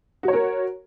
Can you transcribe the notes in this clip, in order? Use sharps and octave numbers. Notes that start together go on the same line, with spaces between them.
F#4 A#4 C#5